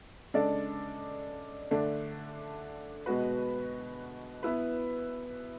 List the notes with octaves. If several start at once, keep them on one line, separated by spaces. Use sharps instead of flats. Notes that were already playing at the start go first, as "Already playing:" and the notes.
C#3 G#3 D4 A4 D5
D3 A3 D4
B2 G#3 B3 F#4 B4
B3 E4 B4